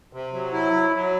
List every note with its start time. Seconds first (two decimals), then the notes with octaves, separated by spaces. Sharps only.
0.13 C3
0.33 F#3
0.53 E4
0.73 F#3
0.94 F#3